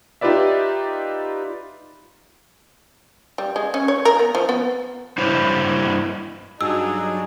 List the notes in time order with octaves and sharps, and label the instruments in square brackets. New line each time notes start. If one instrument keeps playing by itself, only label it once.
[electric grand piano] D#4 F4 G4 B4 D5 E5
[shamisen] G3
G#3
C#4
C#5
A#4
B3
F3
B3
[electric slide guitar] G2 E4 C5 C#5
[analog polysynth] G2 F#3 D4 [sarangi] D#4 [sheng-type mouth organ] G#4 [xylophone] E6